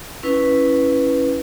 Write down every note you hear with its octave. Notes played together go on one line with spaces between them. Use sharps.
C#4 E4 B4